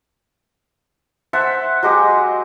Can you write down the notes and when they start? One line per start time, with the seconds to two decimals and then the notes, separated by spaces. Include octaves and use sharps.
1.33 C5 E5 F#5 A5
1.83 F#3 G#3 G4 D#6